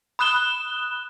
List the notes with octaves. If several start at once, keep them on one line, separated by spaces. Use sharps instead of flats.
B5 D#6 F#6 E7 G7